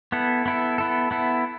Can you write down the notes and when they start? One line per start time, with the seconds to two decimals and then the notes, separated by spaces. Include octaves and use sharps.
0.12 B3 E4 A4
0.46 B3 E4 A4
0.78 B3 E4 A4
1.11 B3 E4 A4